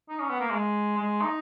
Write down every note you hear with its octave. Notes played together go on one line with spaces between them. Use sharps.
D#4
C#4
B3
A#3
G#3
G#3
D#4